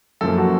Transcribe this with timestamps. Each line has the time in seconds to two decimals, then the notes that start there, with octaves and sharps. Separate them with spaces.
0.21 F#2 F3 A#3 A4
0.38 F#4